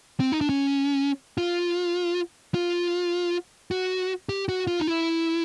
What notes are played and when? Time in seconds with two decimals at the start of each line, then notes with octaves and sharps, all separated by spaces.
0.20 C4
0.32 D#4
0.41 D4
0.49 C#4
1.38 F4
2.54 F4
3.71 F#4
4.29 G4
4.49 F#4
4.67 F4
4.80 D#4
4.87 E4